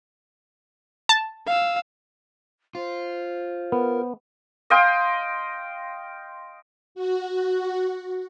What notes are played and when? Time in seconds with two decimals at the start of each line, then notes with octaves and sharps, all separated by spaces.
1.09 A5
1.46 F5 E6
2.75 F4 C5
3.72 B3 A#4
4.70 D#5 F5 G5 C6
6.95 F#4